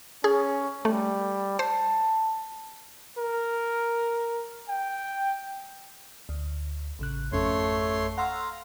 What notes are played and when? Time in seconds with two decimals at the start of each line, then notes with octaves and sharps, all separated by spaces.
0.24 C#4 G#4
0.85 G3 A3
1.59 C5 A5
3.19 A#4
4.69 G5
6.29 D2
6.99 A1 C#3 F#6
7.32 G#1 F2 A3 C#4 C#5 C6
8.18 F5 F#5 A#5 C6 E6